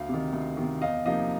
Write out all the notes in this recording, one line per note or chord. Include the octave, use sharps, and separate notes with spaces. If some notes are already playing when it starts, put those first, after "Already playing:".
Already playing: D2 F5
C3 D#3
D2
C3 D#3
E2 D#5 F5
C3 F3 A#3 D#4 D#5 F5